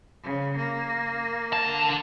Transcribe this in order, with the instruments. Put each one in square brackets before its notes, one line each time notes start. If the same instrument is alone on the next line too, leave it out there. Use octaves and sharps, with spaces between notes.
[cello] C#3
A#3
[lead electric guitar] D3 A5